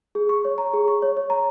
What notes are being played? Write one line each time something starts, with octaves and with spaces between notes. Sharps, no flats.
G#4
C#6
C#5
A#5
G#4
C#6
C#5
C#5
A#5